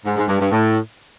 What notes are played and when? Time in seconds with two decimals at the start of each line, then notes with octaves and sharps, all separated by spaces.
0.05 G#2
0.17 G#2
0.28 G2
0.40 G2
0.51 A2